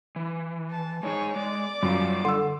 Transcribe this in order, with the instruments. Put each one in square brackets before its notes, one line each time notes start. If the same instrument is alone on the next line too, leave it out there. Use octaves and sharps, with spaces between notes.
[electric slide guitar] E3
[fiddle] A5
[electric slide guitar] G#3 D#4 G#4 [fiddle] C#5 G#5
[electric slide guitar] G#3 [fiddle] D5 D6
[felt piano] F#2 [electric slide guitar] G3 F4 F5
[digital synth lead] D3 [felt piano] C6 E6